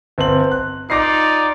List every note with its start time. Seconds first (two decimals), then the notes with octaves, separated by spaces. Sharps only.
0.18 G1 C4 F#7
0.52 F#6
0.90 D#4 F4 D5 D6 A#6 C7